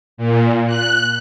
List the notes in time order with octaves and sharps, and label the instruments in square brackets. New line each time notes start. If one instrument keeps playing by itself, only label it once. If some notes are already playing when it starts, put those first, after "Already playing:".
[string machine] A#2
F#6